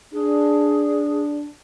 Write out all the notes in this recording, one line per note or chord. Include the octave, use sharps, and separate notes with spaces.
D4 G#4